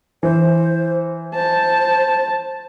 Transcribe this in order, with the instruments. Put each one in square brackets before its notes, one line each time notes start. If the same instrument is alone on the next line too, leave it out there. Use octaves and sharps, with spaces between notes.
[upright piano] E3 [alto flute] C5
[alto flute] C5 [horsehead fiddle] A5